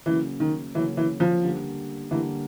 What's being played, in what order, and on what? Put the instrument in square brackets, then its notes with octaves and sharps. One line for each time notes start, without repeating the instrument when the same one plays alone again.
[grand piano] C#3 F#3 A#3 C#4 [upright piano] E3
[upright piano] D#3
[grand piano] C#3 F#3 A#3 C#4 [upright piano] E3
[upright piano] E3
F3
[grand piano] D3 G3 A#3
[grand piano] D3 G3 A#3 [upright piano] E3